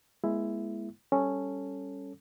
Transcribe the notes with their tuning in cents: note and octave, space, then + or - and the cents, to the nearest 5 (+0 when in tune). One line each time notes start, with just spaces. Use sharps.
G#3 +10 B3 -40 E4 +10
G3 +0 C#4 +0 A4 +0